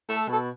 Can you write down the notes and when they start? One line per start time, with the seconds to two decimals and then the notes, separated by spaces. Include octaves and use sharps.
0.09 A3
0.16 A4
0.28 B2 A4